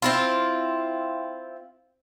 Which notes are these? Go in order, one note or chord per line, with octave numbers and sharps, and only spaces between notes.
C4 E4 F4